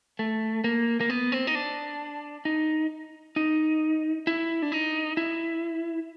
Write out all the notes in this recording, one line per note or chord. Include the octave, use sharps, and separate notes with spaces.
A3
A#3
A#3
B3
C4
D#4
D4
D#4
D#4
E4
D4
D#4
E4